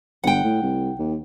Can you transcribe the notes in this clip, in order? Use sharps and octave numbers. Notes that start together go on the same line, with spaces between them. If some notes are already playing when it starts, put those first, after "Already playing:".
G1 F#5 G5
A2
C2
D#2